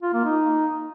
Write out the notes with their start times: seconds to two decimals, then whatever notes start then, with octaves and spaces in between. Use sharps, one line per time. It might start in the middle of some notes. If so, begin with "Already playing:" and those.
0.03 F4
0.13 A#3
0.24 D#4